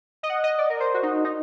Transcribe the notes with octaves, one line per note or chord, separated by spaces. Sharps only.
D#5
F#5
D#5
D5
A#4
C5
F#4
D#4
D#4